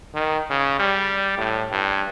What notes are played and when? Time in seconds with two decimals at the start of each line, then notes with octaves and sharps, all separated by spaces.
0.15 D#3
0.50 C#3
0.80 G3
1.38 A2
1.72 G2